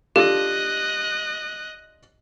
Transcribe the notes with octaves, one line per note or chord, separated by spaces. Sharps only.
D4 F4 G4 A4 D#5 F#6